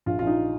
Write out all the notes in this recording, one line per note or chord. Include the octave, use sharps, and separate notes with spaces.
A#1 F4
F4
A#1 D#4